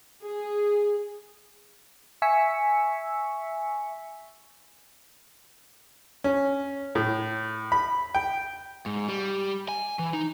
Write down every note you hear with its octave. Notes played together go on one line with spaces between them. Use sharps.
G#4
E5 G#5 C#6 E6 B6 C#7
C#4
A2
B5
G5
G#2
G3
G#5
E3
D#4